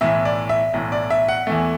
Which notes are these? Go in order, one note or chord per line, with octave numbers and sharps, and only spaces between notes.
B1 A2 E3 E5
D5
E5
B1 A2 E3
D5
E5
F#5
E2 E3 A3